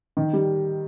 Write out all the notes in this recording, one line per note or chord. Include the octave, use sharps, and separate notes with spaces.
D#3
G3